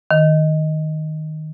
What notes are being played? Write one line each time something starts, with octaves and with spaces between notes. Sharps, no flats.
D#3